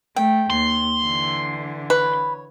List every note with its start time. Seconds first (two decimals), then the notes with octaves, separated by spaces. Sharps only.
0.16 A3 G5
0.50 D#2 C6
1.02 D3 E3
1.90 B4 C#5